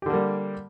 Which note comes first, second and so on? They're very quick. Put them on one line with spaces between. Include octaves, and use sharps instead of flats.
G4 D3 A#3 G3